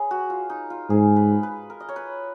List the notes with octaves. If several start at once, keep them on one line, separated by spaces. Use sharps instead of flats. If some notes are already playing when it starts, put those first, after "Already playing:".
Already playing: G#4 B4 C#5 G#5
F#4
F4
D#4
F4
G#2 G#4
B4
B4
A#4
D#5
C#5
B4